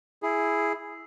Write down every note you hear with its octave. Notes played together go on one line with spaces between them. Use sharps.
E4 G#4